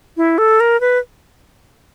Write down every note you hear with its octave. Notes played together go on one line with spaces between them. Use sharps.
E4
A4
A#4
B4